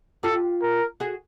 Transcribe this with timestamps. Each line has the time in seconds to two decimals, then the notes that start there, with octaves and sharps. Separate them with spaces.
0.23 F4 G4 A4
0.62 A#4
1.00 F#4 G#4